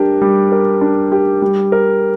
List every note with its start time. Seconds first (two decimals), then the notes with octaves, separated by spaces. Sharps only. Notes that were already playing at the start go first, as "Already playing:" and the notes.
Already playing: G3 D4 G4 A#4
0.22 G3
0.52 A#4
0.81 D4
1.12 G4
1.42 G3
1.72 A#4